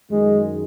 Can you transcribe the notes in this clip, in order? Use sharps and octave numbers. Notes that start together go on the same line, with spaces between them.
F#2 D#3 G#3